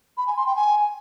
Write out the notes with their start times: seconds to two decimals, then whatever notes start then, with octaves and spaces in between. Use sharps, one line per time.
0.17 B5
0.27 G#5
0.37 C6
0.46 G5
0.56 G#5